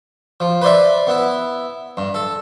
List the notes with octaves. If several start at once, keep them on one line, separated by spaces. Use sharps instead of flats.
F3
B4 C5 D5 E5
B3 E4
G2
A4